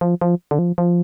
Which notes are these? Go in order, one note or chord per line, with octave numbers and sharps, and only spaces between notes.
F3
F3
D3
F3
F3